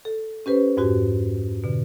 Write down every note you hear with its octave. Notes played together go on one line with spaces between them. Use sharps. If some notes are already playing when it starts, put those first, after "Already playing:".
A4
C#4 G4 B4 C5
F2 G#2 F#4 G4
B2 D3